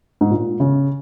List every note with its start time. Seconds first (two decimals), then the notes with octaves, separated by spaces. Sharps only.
0.21 G#2
0.31 A#2
0.60 C#3